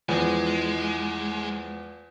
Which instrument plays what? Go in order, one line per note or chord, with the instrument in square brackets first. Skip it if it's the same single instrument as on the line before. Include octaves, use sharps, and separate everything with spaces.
[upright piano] E2 F3 [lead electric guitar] G#3